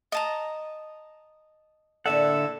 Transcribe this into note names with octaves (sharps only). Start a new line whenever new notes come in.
D#5 A5 A#5
A2 D3 A#3 A4 D5 E5 F#5